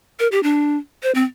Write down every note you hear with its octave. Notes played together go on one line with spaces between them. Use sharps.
A#4
G4
D4
C5
C4